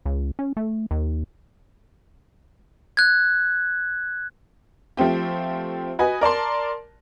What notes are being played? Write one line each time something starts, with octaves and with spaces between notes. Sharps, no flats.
C#2
C#4
A3
D#2
F#6 G#6
F3 A3 C4 G4
F#4 B4 D#5 G#5
A#4 D5 A5 C6